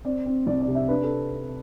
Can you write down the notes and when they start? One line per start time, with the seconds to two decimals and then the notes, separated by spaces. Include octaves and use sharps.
0.05 C4 D5
0.26 C4
0.47 C2 D5
0.61 D5
0.68 C3
0.75 E5
0.89 D4 B4
1.03 A4